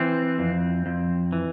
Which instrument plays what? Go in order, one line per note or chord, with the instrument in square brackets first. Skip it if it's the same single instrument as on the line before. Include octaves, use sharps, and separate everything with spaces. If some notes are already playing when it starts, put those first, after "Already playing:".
Already playing: [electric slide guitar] E3 C4
F2
F2
E3